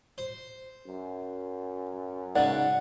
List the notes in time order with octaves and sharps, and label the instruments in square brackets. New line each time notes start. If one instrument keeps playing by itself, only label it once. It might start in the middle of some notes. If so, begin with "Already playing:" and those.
[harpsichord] C5
[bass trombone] F#2
[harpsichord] G#2 C#3 [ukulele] D5 [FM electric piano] F#5